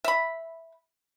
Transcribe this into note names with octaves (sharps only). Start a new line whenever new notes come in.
E5 B5